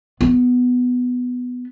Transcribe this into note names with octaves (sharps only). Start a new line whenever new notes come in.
B3